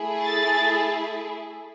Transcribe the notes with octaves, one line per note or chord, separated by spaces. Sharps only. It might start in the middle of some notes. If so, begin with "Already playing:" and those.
Already playing: A3 E4 G#4
A6